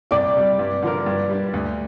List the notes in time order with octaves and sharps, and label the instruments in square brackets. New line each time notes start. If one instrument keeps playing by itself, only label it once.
[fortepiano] C2 [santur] D5 G5
[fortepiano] C3 G3
G2
D3 F3 D4 A#4
G2
G3 D4
D2